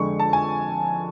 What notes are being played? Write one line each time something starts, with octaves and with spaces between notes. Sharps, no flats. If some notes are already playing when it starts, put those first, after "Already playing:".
Already playing: F2 D3 G#3 C#6
A5
G#5